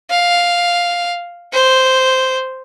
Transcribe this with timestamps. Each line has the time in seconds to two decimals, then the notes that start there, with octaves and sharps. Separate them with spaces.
0.10 F5
1.53 C5